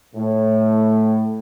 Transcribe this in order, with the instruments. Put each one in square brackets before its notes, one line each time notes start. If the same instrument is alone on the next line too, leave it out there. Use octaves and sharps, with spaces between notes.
[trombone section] A2